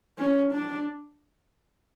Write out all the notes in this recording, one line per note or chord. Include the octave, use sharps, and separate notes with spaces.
C#4
D4